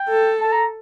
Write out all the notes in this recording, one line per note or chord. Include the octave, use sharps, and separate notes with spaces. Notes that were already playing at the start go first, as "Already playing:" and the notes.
Already playing: G5
A4
A5
A#5